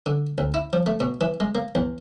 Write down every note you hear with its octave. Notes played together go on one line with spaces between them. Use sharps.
D3
D2
E4
F3
A3
B2
E3
G#3
A#3
E2